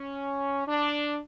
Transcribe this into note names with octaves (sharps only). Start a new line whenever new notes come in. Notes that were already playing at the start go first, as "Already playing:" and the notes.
Already playing: C#4
D4